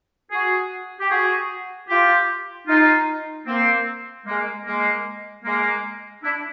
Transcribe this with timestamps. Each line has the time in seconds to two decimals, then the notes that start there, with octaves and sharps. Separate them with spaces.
0.31 F#4 G#4
1.00 G4
1.10 F#4 G#4
1.89 F4 G4
2.68 D#4 F4
3.46 A#3 C4
4.26 G#3 A#3
4.65 G#3 A#3
5.44 G#3 A#3
6.23 D4 E4